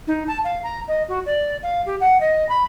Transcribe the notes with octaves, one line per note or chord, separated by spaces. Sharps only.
D#4
A5
F5
A#5
D#5
F#4
D5
F5
G4
F#5
D#5
B5